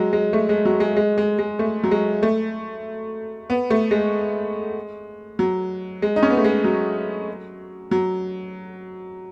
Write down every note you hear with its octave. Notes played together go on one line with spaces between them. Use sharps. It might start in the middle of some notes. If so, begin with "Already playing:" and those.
Already playing: F#3 G#3
G#3
A3
G#3
F#3
G#3
G#3
G#3
G#3
A3
F#3
G#3
A3
B3
A3
G#3
F#3
G#3
D#4
C#4
B3
A3
G#3
F#3
F#3